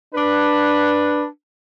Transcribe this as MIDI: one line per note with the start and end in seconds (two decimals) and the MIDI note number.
0.14 1.25 62
0.14 1.25 71